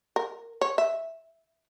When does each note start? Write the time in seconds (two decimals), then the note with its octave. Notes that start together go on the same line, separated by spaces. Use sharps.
0.16 A#4
0.61 C#5
0.78 E5